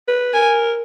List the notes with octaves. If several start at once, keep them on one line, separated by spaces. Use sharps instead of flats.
B4
A#4 G#5